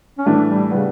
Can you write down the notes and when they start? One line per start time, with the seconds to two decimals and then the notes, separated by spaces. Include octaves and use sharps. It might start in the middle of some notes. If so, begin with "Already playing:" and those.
0.18 C#4
0.26 A2 E3 A3 D4
0.48 G3
0.70 A2 C#3 G3 B3 D4